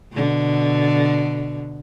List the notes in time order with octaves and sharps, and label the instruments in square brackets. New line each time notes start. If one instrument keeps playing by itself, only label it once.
[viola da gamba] B2 D3